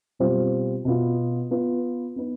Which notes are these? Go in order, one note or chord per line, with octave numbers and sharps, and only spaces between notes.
B2 G3 C4 F4 C5
B2 B3 F4
B3 F4 B4
B3 D#4 B4